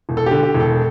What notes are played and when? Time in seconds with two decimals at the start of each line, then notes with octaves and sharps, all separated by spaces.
0.09 E1
0.17 A4
0.26 D3 G4
0.43 G4
0.54 E1
0.60 A4